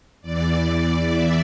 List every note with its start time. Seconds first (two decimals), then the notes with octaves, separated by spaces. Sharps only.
0.21 E2 E3 D5
0.65 D5
1.08 E5